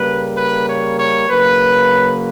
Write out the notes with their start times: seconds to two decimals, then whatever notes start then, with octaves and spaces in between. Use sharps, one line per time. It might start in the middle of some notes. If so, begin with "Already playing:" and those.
Already playing: C#3 G3 A#3 B4
0.35 B4
0.67 C#5
0.98 C#5
1.29 C#3 F#3 A#3 B4